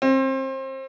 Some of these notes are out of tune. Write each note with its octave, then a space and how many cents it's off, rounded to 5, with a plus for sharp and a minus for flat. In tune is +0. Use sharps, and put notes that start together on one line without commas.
C4 +30